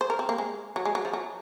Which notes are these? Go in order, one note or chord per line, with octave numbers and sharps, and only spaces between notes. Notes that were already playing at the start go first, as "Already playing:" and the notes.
C5
A#4
C4
A#3
G#3
F#3
G#3
F#3
F3
F#3